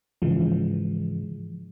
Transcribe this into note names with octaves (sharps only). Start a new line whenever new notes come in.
G#2 C#3 E3 F3 G#3